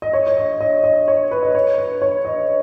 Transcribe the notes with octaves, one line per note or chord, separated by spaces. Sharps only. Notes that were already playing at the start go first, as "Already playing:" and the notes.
D#5
C#5
C#5
D#5
D#5
D#5
C#5
B4
D#5
C#5
B4
C#5
D#5